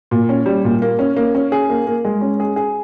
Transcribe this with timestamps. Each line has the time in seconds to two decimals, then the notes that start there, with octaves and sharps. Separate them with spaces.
0.11 A#2
0.29 C#4
0.46 G3
0.64 A#2
0.82 A#3
0.99 C#4
1.17 A#3
1.35 C#4
1.52 G#4
1.70 A#3
1.87 A#3
2.05 G#3
2.21 C#4
2.40 G#4
2.56 G#4